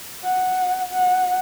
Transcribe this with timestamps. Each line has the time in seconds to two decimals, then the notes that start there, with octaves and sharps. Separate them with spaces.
0.23 F#5
0.92 F#5